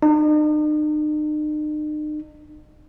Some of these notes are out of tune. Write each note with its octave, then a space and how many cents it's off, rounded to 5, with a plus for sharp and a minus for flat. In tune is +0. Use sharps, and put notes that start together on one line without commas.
D#4 -45